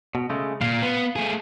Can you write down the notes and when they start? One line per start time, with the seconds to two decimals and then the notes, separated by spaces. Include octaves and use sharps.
0.15 B2
0.30 C#3 G#3 A3
0.61 A#2 F5
0.83 B3
1.16 A3 G#4